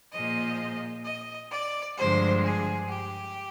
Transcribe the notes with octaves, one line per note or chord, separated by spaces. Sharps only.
A#2 F3 G#3 D#5
D#5
D5
G2 D3 F3 G#3 C5
G#4
G4